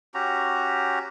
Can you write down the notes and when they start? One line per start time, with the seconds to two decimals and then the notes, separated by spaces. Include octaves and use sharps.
0.14 C#4 F#4 G4 A#5